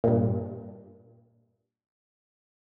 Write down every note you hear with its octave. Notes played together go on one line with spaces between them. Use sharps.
G2 A#2